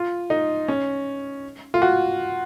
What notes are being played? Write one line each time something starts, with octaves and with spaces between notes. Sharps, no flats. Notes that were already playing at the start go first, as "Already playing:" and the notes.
Already playing: F4
D#4
C#4
F4
F#4